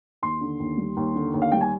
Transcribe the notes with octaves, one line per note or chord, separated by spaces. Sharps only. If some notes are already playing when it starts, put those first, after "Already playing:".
D#2 C6
D3
D#2
G3
D#2
D3
D#2
F5
G3 G5
G#5